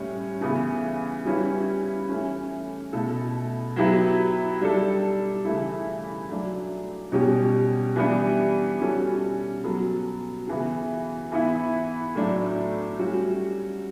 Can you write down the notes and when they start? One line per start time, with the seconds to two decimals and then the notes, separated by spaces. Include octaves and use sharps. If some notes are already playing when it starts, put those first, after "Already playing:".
Already playing: A2 G3 C#4
0.41 C#3 E3 B3
1.25 G3 C#4 E4 B4
2.09 E3 A3 C#4
2.93 B2 A3 E4 A4
3.76 F#3 B3 E4 G4 B4
4.61 G3 D4 A4
5.44 C#3 E3 A3 E4
6.29 F#3 A3 D4
7.12 B2 G3 C#4 G4
7.96 E3 G3 B3 D4
8.80 G3 C#4 F#4 A4
9.64 F#3 B3 F#4 A4
10.47 C#3 E3 B3
11.32 E3 B3 E4
12.15 A2 F#3 A3 D4
12.99 G3 C#4 F#4